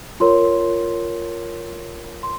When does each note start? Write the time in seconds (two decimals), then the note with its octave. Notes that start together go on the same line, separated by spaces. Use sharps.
0.20 F4 A#4 C#5 C6
2.23 C6